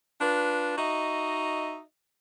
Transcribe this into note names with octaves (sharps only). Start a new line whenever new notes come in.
D4 F4 B4
D#4 F#4 D#5 E5